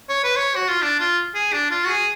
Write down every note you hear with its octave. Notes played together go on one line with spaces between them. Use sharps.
C#5
B4
C#5
F#4
F4
D4
F4
G#4
D4
F4
F#4
G#4